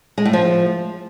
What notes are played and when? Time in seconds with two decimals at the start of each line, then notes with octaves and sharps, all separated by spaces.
0.18 G#3
0.25 A2
0.33 F3